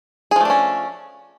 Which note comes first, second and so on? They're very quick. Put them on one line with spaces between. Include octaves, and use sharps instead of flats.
G#4 F3 A3 D4 C#4